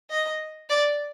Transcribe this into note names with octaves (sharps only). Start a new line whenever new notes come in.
D#5
D5